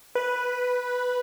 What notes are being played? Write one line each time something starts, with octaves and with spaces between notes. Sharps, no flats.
B4